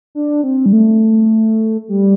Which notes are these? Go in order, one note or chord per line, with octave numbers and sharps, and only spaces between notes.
D4
C4
G3
A3
G3